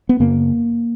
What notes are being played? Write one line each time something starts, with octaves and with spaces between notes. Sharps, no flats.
B3
F#2 C#3 A#3